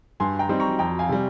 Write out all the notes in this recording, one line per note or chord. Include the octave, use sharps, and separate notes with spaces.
G2 G#5 C6
G5 A#5
G3 C4 D#4
A#5 C#6
F2 G5 A#5
F5 G#5
C3 G3